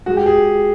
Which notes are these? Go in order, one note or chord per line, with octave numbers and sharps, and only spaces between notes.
G#3 F#4
G4
G#4